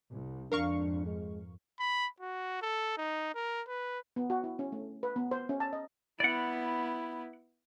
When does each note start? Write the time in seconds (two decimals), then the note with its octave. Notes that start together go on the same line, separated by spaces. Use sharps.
0.11 C2
0.52 F2 G#2 D4 A#4 F5 C#6
1.06 G#3
1.79 B5
2.20 F#4
2.62 A4
2.97 D#4
3.34 A#4
3.68 B4
4.16 B3
4.30 F#4
4.44 E4
4.59 C#4
4.72 A3
5.03 B4
5.16 B3
5.31 C5
5.49 C#4
5.60 A5
5.73 D#5
6.20 B3 E4 D5 F#5